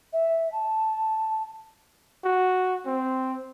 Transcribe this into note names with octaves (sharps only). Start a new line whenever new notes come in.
E5
A5
F#4
C4